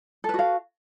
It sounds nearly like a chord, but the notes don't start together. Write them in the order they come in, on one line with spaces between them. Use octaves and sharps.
A4 B4 F#4 F5